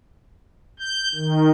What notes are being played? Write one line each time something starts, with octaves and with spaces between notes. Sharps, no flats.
G6
D#3